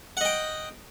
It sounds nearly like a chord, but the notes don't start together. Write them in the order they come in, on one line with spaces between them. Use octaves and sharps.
F#5 D#5 G5